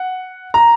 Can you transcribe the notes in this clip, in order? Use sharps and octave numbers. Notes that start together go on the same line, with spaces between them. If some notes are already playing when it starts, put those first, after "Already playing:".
Already playing: F#5
A#5